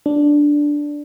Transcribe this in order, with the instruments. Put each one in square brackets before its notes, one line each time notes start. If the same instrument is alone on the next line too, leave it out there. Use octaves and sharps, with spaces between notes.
[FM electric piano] D4